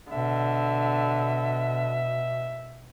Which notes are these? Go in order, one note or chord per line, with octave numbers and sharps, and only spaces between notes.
B2 D3 E5